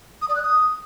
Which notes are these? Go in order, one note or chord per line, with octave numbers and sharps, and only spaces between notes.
D#6
D5
F#6
D#6